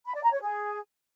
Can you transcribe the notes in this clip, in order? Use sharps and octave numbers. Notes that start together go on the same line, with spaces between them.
B5
D5
A#5
C#5
G#4